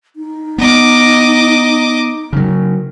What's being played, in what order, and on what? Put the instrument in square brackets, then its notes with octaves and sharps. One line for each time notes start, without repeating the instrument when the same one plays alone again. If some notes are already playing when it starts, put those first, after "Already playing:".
[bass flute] D#4
[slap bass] B3 [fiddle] D#5 D6
[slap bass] C#3 F#3